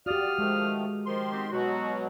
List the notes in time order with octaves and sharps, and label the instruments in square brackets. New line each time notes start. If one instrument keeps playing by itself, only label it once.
[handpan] F#4 G4 [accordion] D5 [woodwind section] F5 D#6 F6
[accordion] D#3 F3 A3 [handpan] G#3
[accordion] D#3 C6 [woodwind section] F3
[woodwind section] B3 C4 G4
[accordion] B2 F#3 [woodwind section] F#4